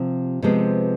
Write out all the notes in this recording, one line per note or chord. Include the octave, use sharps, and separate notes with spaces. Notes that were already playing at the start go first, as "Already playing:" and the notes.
Already playing: C3 F3
C3 F3 G#3 B3